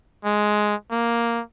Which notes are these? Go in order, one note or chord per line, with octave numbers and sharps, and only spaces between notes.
G#3
A#3